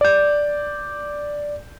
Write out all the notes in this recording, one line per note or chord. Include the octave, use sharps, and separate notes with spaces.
D5 G6